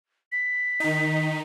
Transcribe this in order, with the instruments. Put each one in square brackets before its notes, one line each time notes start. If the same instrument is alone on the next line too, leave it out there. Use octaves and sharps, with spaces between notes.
[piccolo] B6
[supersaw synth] D#3 D#4